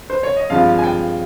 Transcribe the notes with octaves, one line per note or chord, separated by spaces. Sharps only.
C5
C#5
D#5
G2 F3 G#3 C4 F4 F5
G#5
G5